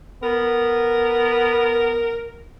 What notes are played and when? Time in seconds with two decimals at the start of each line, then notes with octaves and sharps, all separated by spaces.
0.23 B3 A#4